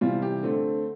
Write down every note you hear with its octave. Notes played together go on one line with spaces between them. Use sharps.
C3 E3 G3 F4
G4
D3 A3 C4